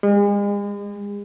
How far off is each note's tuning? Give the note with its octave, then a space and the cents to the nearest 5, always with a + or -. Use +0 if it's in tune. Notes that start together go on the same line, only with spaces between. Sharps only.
G#3 -40